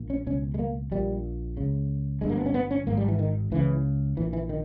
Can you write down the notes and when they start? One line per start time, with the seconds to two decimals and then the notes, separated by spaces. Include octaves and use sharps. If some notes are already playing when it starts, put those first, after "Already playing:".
Already playing: A#1 A#2
0.10 C#4
0.26 C#2 B2 C#4
0.54 G#3
0.59 A#3
0.91 A#1 A#2 G3
1.57 C#2 C#3
2.21 G1 G2 G#3
2.30 A#3
2.37 B3
2.46 C#4
2.54 B3
2.71 C#4
2.87 G#1 G#2 A#3
2.97 G3
3.08 E3
3.19 D#3
3.52 C#2 C#3 E3
4.17 A#1 A#2 E3
4.33 E3
4.49 D#3